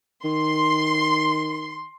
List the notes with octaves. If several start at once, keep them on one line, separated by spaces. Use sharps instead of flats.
D#3 C6